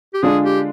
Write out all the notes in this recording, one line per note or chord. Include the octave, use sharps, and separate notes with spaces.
G4
D3 G#3 D4 F4 G#4
G4